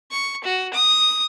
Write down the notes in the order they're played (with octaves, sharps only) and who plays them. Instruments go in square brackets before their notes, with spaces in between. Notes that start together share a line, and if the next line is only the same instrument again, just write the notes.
[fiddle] C#6
F#4
D#6